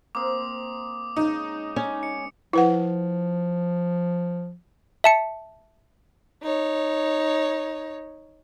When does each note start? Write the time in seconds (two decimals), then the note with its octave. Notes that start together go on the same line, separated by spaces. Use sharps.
0.15 A#3 C4 C5 D6 D#6
1.16 C#3 G#3 D#4
1.76 C#4
2.03 G#3 C#7
2.53 F3 E4 B4 F#5
5.04 E5 A5 C#7
6.43 D#4 C#5